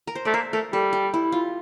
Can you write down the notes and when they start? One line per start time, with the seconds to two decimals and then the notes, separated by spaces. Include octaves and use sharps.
0.07 A#4
0.15 C5
0.25 A3 D5
0.34 A#3 E5
0.53 A3 A#4
0.73 G3 A4
0.93 G4
1.14 E4
1.32 F4